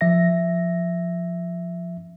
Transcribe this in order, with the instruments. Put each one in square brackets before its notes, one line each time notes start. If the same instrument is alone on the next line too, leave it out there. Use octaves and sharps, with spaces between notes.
[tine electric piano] F3 E5 A#6